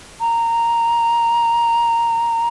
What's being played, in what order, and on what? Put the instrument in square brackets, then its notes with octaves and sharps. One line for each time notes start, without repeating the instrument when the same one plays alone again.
[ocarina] A#5